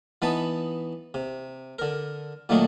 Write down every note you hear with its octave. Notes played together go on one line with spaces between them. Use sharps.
E3 B3 D#4 B4 A5
C3
D3 A#4
A#2 D#3 F#3 A3 D4 D#4